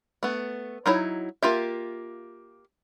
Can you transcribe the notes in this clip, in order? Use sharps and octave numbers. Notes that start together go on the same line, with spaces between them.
A3 B3
F#3 D#4 E4 C#5
A#3 F4 G4 E5